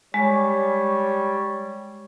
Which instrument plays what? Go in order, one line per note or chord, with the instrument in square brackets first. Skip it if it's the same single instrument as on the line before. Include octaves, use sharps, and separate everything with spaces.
[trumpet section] G3 C#5 [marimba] G#3